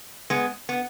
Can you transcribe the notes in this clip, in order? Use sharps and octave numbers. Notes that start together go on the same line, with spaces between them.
G#3 B3
B3